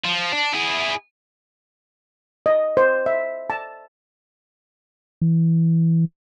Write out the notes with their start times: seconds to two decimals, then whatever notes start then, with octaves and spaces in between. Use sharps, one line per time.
0.04 F3
0.32 D4
0.54 E4 G#4
2.46 D#5
2.77 C5
3.06 E5
3.50 A5
5.21 E3